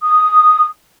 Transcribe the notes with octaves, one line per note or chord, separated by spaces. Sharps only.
D#6